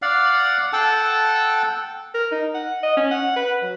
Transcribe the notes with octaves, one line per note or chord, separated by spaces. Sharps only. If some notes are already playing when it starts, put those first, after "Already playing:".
D5 F5 F#5
A4 F#5 G5 A5
A#4
D#4
F#5
D#5
C#4
F#5
B4
F#3